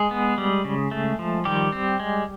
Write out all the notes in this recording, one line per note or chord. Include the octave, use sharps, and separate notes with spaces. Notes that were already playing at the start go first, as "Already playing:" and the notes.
Already playing: G#3 G#4
B3
G3
C#3
A3
F3
D#3 G3 G4
C4
G#3